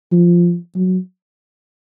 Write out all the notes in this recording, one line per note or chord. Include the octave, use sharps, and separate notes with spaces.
F3
F#3